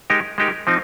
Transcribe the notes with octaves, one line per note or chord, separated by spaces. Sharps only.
G#3 D#4 G4 A#4
G#3 D#4 G4 A#4
F3 C4 D#4